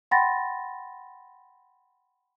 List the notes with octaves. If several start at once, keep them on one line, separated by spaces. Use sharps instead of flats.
F#5 G5 B5 C6 A6 A#6